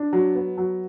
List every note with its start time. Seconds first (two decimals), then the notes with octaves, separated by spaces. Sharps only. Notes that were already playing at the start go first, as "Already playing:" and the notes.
Already playing: D4
0.13 F#3
0.35 B3
0.58 F#3